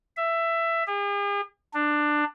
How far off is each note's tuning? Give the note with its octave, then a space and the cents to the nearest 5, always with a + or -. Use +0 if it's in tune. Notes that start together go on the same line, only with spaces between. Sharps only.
E5 +15
G#4 -45
D4 +15